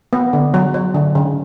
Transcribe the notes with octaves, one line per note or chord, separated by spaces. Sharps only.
B3
D3
F#3
F#3
D3
C#3